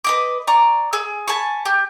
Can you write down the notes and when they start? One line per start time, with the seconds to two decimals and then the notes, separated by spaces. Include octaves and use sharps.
0.04 B4 D#5 D6
0.47 D5 A#5 C#6
0.93 G#4 E6
1.28 G#5 A5 B5 C#6
1.65 G4